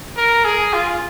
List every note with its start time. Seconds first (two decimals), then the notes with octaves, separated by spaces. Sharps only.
0.17 A#4
0.44 G#4
0.73 F4